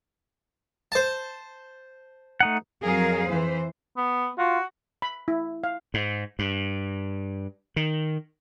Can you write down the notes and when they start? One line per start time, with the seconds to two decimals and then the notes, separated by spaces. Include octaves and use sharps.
0.92 C5 A5
2.40 A3 D#4 F#5
2.83 F2 F#3 G#4 A#4 F5
3.29 E3 C5
3.97 B3
4.38 F4 F#4
5.02 B5
5.28 E4
5.64 F5
5.94 G#2
6.39 G2
7.76 D#3